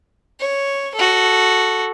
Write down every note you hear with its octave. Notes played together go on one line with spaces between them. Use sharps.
C#5
F#4 A4